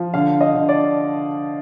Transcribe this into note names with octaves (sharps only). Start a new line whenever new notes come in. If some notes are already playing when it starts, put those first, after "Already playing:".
Already playing: F3
D3 F5
D#5
D3
D5